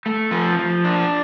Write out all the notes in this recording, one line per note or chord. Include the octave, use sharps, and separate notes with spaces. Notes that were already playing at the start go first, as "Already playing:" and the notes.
A3
F3
F3
D4